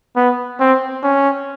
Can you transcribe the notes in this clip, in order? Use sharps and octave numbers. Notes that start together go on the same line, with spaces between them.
B3
C4
C#4